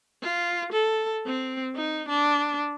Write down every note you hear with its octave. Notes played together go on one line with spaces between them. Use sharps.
F4
A4
C4
D#4
D4